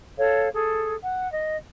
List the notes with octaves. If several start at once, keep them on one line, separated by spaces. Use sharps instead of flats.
A4 C#5 F5
G#4 A4
F#5
D#5